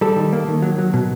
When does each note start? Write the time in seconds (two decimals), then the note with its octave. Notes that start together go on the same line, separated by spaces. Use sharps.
0.01 G3 A4
0.16 D#3
0.33 A#3
0.48 D#3
0.62 F#3
0.79 F#3
0.94 B2